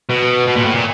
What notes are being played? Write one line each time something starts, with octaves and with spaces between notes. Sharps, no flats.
B2
B2
A#2
A2
A#2